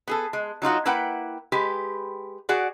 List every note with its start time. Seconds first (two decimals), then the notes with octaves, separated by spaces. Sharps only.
0.08 B3 G#4 A4
0.33 G#3
0.62 F#3 D#4 F4 F#4
0.85 A#3 E4 B4 F#5 G5
1.52 G#3 G4 B4
2.49 F#4 G#4 D5 F#5